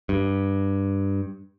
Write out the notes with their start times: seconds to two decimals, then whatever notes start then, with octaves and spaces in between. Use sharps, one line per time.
0.09 G2